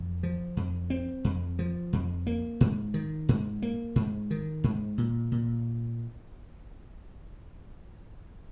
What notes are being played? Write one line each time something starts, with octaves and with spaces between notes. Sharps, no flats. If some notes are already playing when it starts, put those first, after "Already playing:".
Already playing: F2
F3
F2
C4
F2
F3
F2
A#3
G#2
D#3
G#2
A#3
G#2
D#3
G#2
A#2
A#2